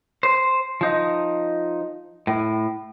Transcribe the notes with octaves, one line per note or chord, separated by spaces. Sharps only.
C5
F3 D#4
A2